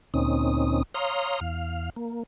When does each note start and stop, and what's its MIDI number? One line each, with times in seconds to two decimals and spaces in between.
0.14 0.83 38
0.14 0.83 46
0.14 0.83 60
0.14 0.83 61
0.14 0.83 63
0.14 0.83 87
0.94 1.40 73
0.94 1.40 77
0.94 1.40 82
0.94 1.40 84
0.94 1.40 87
1.41 1.90 40
1.41 1.90 77
1.96 2.23 58